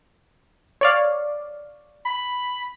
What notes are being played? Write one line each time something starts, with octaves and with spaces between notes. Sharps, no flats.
C#5 D5 F5
B5